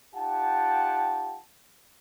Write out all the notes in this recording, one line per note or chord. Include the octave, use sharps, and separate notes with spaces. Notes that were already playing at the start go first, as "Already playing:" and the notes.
D#4 F4 G4 F#5 G5 A5